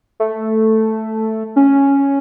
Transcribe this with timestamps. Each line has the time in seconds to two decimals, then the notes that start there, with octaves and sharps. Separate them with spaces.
0.20 A3
1.56 C#4